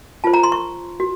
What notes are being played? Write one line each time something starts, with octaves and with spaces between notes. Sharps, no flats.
F4 C5 A5
A#5
C6
C#6
F#4